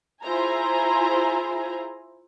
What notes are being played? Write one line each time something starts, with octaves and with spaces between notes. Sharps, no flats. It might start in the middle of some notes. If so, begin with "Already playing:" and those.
E4 F4 G#4 C5 G#5 A#5